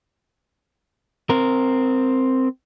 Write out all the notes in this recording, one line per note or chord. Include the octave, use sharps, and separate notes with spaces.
C4 A#4